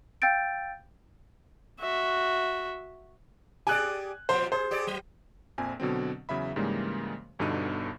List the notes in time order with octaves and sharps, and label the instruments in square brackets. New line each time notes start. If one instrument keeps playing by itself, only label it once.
[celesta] F5 G5 E6 G6 A6 D7
[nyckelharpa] F#4 E5
[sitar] G4 G#4 D5 [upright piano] G#5 F#6
[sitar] A#2 F3 G3 [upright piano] C5
[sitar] G#4 [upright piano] C5
[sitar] G4 G#4 D5
F#3
[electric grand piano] A#1 F2 C4 G#5
B2 D3 F#3 C4
E2 C#3 F#3 E5 B5
G#2 C#3 E3 G3 G#3 A#3
G1 G2 B2 D3 D#4 D#7